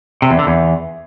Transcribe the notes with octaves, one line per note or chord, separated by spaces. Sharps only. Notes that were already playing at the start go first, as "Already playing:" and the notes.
C3
E2
D3
E2